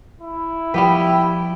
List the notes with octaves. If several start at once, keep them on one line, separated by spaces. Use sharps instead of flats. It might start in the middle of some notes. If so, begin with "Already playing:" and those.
E4
F3 G3 B3 G4 B4 G5